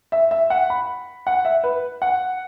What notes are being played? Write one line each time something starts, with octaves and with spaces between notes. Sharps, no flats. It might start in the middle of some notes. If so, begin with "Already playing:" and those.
E5
E5
F#5
B5
F#5
E5
B4
F#5